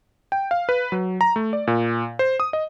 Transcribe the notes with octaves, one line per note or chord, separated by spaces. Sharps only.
G5
F5
B4
F#3
A#5
A3
D5
A#2
C5
D#6
D#5